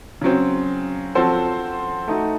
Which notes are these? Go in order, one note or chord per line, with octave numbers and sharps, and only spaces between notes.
C#3 F#3 C4
F3 C4 F#4 A4 C5
A3 D#4 F#4